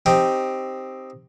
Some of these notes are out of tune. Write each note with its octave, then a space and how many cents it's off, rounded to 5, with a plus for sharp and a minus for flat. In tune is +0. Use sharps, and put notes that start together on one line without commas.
C4 +0 D#4 +0 G4 +0